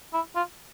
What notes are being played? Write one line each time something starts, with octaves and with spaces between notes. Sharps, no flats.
E4
F4